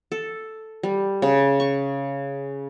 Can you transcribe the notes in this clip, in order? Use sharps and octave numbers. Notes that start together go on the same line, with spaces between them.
A4
G3
C#3
C#6